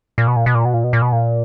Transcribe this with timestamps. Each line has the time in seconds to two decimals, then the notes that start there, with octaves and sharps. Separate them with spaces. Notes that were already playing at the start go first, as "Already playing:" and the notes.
0.18 A#2
0.27 B2
0.36 A#2
0.46 B2
0.55 A#2
0.65 B2
0.74 A#2
0.84 B2
0.93 A#2
1.02 B2
1.12 A#2